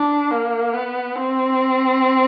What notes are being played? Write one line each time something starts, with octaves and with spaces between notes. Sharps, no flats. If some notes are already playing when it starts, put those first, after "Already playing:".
Already playing: D4
A#3
B3
C4